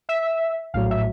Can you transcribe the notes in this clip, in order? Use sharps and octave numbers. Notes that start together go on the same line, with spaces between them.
E5
A#1 A2 F#3 F5
E5